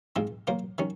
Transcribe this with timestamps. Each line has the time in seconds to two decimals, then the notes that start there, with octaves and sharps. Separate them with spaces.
0.16 G#2 F3 G#3 C4 F4
0.47 F#3 A#3 F4 C5
0.78 D#3 F#3 C#4